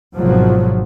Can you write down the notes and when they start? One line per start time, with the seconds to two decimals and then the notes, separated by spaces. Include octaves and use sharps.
0.15 G#1 B2 F3 F#3